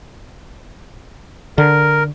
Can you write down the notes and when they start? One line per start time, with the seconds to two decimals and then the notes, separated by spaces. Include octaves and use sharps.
1.58 D3 A#4